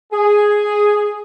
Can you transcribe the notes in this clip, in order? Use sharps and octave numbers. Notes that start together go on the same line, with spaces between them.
G#4